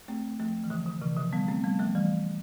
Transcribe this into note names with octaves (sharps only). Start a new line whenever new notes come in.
A3 C4
F3 A3
E3
D3 F3
D3
C3 E3
D3 F3
G3 B3
A3 C4
G3 B3
F3 A3
E3 G3